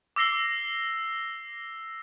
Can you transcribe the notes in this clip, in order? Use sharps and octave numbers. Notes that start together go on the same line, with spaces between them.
D6 E6 A#6 C7 G7